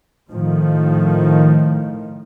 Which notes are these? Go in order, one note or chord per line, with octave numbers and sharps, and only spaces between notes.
A2 D#3 F3